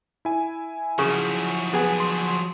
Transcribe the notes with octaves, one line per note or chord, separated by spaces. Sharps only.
E4 G#5
C#3 F3 F#3 C#6
B3 G#4 G#5
C6